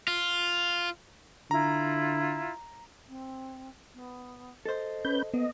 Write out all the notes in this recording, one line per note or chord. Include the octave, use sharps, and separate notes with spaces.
F4
D3 E4 F4 A#5
C4
B3
A4 C5 D#5
C#4 B4 G6
A#3 B3 D#5